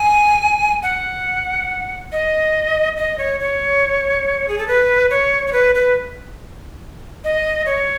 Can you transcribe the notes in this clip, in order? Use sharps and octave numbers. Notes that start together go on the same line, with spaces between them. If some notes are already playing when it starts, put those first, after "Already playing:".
Already playing: G#5
F#5
D#5
D#5
C#5
C#5
G#4
A4
B4
C#5
C#5
B4
B4
D#5
C#5